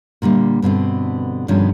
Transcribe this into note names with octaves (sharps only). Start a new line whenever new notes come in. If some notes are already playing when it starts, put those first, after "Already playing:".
A#2 D3 G3 A#3
G2 B2 D3 C4
G2 B2 D3 D#3 F3 C#4